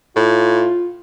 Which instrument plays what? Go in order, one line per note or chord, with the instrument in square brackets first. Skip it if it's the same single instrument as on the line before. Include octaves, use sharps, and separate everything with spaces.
[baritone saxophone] A2 [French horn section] F4